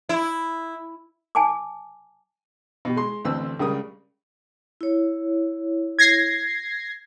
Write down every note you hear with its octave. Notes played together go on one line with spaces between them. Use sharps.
E4
G#5 A5 D6
B2 G4
G#3 C6
A1 D2 C4 B4 C5 E6
C#2 C#3 G3 A#4 D#6
E4 C#5
G#6 A#6 C7